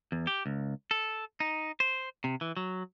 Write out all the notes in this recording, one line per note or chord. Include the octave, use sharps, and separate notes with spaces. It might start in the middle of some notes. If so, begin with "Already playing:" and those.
E2
G4
C#2
A4
D#4
C5
C3
E3
F#3